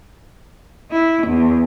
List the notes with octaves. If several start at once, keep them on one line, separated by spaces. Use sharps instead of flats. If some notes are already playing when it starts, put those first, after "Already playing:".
E4
E2